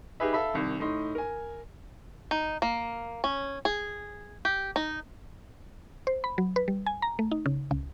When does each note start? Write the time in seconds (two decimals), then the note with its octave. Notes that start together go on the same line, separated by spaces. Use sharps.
0.20 D#4 G4 G#4 B4 E5
0.33 A4 E5 F5 B5
0.54 C2 D#3
0.80 A2 D#4 C6
1.15 A#4 G#5
2.31 D#4
2.62 A#3
3.24 C#4
3.65 G#4
4.45 G4
4.76 D#4
6.07 C5
6.24 B5
6.38 F#3
6.56 B4
6.68 G3
6.86 G#5
7.02 A#5
7.19 A3
7.31 D#4
7.46 C#3
7.71 C#2